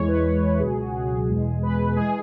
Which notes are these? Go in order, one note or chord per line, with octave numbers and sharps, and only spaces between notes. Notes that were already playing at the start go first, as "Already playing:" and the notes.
Already playing: E2 E3 G#3 C#5
B4
C#2 B2 F#3 G#4
F#4
G#4
E2 B2 G#3
B4
E3 G#3 G#4